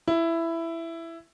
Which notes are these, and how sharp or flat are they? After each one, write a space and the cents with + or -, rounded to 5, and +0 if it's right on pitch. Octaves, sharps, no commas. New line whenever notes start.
E4 +10